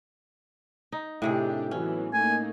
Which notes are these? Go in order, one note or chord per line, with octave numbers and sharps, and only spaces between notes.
D#4
A2 C3 D4 G4 G#4
E3 F#3 B3 C#4
A3 A#3 D#4 G#5